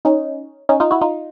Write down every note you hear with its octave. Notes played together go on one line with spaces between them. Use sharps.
C#4 D#4
C#4 D#4
D#4 F4
E4 F#4
D#4 F4